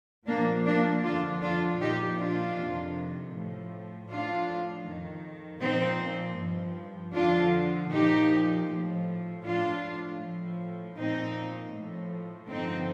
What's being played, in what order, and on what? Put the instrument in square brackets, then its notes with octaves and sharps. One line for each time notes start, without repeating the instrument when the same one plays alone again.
[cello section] A#2 F3 A#3 D4
A#3 D4
F2 D3 F3 D4 F4
D4 F4
A#2 F3 D#4 G4
D4 F4
F2 C3 D#3
A2 F3
A2 F3 D4 F4
F2 D#3
A#2 F3 C4 D#4
G2 F3
F2 D3 F3 D4 F4
A#2 F3 D#4 G4
A2 F3
A2 F3 D4 F4
A2 F3
A#2 F3 C4 D#4
A2 F3
G2 D3 F3 C4 D#4